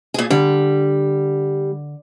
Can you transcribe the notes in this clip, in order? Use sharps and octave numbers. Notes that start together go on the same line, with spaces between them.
A#2 G#4
D3 G3